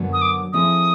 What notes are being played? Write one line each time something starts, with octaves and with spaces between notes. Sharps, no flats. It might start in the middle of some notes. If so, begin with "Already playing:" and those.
Already playing: F#2 D3 F#3 B3
D#6
D6
F3 A3 C4 E4 G#4 D#6